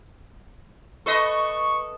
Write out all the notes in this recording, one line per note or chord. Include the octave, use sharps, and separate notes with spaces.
A4 B4 D#5 C#6